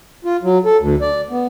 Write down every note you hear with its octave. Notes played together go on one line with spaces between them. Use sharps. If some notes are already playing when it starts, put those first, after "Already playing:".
F4
F#3
A4
D2
D5
B3